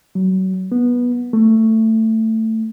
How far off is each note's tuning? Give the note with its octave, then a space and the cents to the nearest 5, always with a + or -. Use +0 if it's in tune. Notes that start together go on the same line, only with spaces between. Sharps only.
F#3 +30
B3 -15
A3 +15